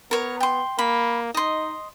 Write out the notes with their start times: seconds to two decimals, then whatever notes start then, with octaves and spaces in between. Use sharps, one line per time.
0.11 B3 A#4 C#5
0.40 G5 C6
0.79 A#3 B5
1.35 D#4 D#5 C6